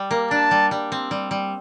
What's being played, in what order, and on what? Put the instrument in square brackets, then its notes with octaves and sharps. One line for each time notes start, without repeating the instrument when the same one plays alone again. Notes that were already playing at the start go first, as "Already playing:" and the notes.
Already playing: [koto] G3
A#3
[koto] D4 [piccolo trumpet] A5
[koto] G3
G3
C4
G3
G3